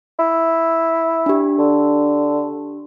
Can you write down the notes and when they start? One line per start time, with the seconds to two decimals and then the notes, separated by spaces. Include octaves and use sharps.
0.19 E4
1.26 D4 G4
1.58 D3